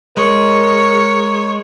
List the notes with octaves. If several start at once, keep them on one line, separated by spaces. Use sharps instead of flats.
G#3 A#4 C#5